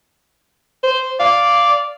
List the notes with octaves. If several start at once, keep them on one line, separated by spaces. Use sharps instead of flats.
C5
D5 F5